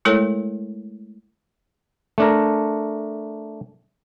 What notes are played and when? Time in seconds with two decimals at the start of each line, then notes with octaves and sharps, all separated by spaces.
0.05 G#3 A3 E4 A4 A#4 C#5
2.18 A3 D4 A#4